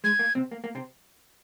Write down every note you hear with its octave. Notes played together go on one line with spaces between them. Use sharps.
G#3 G#6
A#3
C3 C4
A#3
A#3
C3 C4